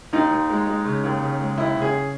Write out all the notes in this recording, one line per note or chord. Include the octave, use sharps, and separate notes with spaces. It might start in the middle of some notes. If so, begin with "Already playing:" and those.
D#2 D#4
D#2
G#3
G#3
C#3
D#2
C#3
G#3
D#2 E4
C#3
G#4